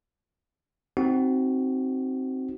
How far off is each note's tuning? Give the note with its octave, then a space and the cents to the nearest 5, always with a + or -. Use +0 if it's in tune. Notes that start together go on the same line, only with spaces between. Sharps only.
C4 +0 D#4 +0 F#4 +20